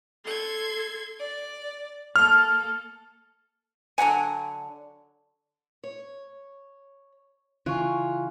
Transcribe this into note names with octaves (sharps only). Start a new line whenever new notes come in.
A4 C6 G#6
D5
A#3 A4 F6
D3 F#3 F#5 G#5
C#5
C#3 E3 F4 G#5 C#6 F#6